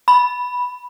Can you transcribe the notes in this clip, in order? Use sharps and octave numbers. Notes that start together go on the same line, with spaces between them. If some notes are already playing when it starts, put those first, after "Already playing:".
B5